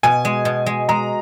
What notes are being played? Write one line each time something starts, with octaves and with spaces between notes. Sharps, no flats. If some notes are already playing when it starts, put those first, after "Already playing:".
B2 G#5
G#3
B2
G#3
G#3 A#5